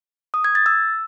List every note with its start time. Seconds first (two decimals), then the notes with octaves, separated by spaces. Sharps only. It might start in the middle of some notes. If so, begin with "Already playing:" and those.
0.34 D#6
0.44 G#6
0.55 A6
0.66 E6